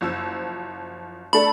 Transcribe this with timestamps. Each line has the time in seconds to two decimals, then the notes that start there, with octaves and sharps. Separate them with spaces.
0.01 F#1 F3 E6
1.33 A3 D4 A4 B5